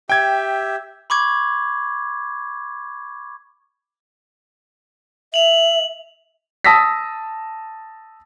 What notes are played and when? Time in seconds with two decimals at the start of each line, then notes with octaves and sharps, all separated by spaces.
0.10 G4 E5 G5 G#6
1.10 B5 C#6 D6 G#6
5.34 E5 F7 F#7
6.65 A5 D#6 E6 A#6 B6